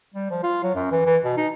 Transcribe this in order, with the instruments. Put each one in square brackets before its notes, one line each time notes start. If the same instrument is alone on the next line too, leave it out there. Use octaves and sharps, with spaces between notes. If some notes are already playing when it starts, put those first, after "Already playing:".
[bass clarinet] G3
F3
F4
F#3
F#2
E3
E3
B2
D#4